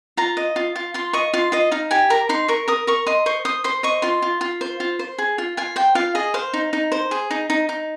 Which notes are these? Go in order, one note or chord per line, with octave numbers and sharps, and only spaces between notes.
F4 A#5
D#5
F4
F4
F4 C6
D#5 C#6
F4 C6
F4 D#5
D#4 F5
G4 G#5
A#4 A#5
D#4 C6
A#4 C#6
A#4 D#6
A#4 C#6
D#5 C6
C5 C#6
C5 D#6
C5 C6
D#5 C#6
F4 C6
F4
F4
C5
F4
C5
G#4
F4
F4 G#5
C5 G5
F4 F5
G#4 D#5
C5 F5
D#4
D#4
C5
G#4
D#4
D#4
D#4